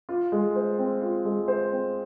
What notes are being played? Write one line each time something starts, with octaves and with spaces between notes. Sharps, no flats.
F4
G#3
C5
C4
F4
G#3
C5
C4